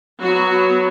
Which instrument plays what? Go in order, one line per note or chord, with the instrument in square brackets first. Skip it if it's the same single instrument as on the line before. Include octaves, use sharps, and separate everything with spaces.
[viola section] F#3 B3 F#4